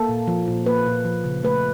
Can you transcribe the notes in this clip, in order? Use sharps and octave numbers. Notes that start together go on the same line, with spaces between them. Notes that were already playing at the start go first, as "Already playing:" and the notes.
Already playing: A#3 A4
A#2
F3
A#2
A#3 B4
A#2
F3
C#3
A3 B4